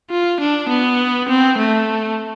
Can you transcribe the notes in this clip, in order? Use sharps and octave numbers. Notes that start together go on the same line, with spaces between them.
F4
D4
B3
C4
A3